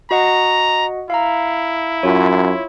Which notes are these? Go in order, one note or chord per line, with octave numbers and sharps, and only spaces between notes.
F#4 D#5 F#5 A#5
E4 F5 A#5
F#2 F4 C#5